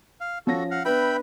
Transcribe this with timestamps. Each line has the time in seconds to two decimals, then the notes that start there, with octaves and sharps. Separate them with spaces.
0.21 F5
0.47 F3 C#4 F#4 A4 A#6
0.71 F5 F#5
0.85 B3 D4 B4 E5 G5 B5